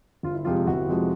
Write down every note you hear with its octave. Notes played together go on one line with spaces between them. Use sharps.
G1 F4
E4
F2 C3 F3 G#3 F4
F4
G1 E4 F#4
F2 C3 F3 G#3